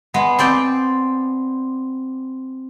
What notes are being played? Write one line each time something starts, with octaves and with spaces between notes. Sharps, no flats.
G#3 B3
C4 D5 G5